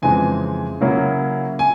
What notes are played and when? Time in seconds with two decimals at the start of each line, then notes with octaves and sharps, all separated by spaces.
0.02 F2 C#3 E3 G#3 C4 G#5
0.81 C#3 F#3 A#3 C#4 E4
1.59 G#5